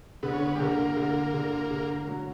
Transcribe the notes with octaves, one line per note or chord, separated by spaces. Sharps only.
D3 B3
C#4
B3
G3
D3 A#3
D3
D3
D3
F#3